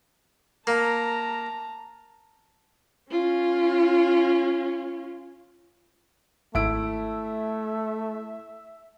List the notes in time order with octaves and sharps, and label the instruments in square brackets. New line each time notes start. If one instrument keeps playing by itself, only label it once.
[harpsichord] A#3 [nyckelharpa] A5 A#5
[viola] C#4 F4
[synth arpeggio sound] G#1 E6 [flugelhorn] A3 [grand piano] E4 D7 [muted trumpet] E5